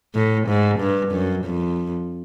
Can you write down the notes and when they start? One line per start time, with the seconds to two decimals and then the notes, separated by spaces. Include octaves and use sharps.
0.14 A2
0.48 G#2
0.80 G2
1.12 F#2
1.45 F2